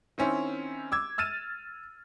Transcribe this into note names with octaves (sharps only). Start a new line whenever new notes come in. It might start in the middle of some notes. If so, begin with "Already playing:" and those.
D#3 C4 C#4 E4
D6 E6 G#6
E6 F6 A6 D#7 E7